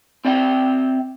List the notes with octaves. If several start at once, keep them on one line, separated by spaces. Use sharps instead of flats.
C4 D5 E5 G5